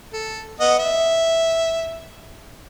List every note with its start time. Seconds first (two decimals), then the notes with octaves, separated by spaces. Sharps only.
0.13 A4
0.60 B3 D#5 F#5
0.79 E5